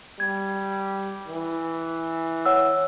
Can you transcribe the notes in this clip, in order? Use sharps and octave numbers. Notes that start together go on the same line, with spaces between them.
G3 G#6
E3
C#5 F#5 E6